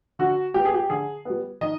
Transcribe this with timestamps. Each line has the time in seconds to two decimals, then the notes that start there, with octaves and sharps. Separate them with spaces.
0.19 D3 F#4
0.54 G3 B3 G4
0.65 G#4
0.74 G4
0.90 D3 G#4
1.25 G3 B3
1.61 D#3 D#5